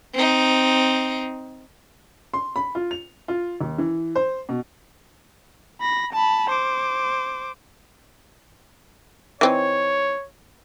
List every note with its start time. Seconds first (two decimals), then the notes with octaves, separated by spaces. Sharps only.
0.14 C4 D#4
2.34 C6
2.56 B5
2.75 F4
2.91 F7
3.28 F4
3.61 D#2
3.78 E3
4.16 C5
4.49 B2
5.81 B5 A#6
6.13 A5 B5
6.49 C5 D6
9.41 E3 C4 D#4 C#5